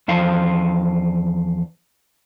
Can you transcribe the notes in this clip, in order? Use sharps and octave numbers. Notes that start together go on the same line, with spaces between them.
E2 F3 F5